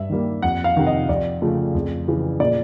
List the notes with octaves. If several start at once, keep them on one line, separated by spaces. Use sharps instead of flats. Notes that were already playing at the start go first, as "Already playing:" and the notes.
Already playing: G2 E5
D#3 G3 A#3
F2 F#5
F5
C3 D#3
D#5
F2 D5
C#3 F3 A3
F2
C#3 E3
A#2 D5